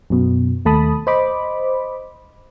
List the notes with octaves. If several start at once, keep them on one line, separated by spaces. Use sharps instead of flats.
F#2 B2
D#2 A3 A5 B5 D#6
C5 D#5 B5 D6